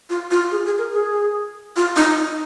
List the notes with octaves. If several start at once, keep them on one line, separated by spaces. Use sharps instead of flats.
F4
F4
G#4
G#4
A#4
G#4
F4
D#4
D#4